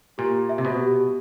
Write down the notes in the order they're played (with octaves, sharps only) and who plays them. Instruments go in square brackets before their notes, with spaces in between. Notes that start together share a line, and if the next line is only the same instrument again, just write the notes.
[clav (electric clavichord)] A#2 [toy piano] G4
[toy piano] E5
[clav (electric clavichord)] C3
B2
[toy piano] G4